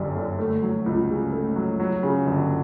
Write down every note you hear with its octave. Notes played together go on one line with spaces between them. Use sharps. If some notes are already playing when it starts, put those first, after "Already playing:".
Already playing: G1 F#2 G3
D3
A3
F#3
C#2
C#3
A3
F#3
F#3
C#3
G1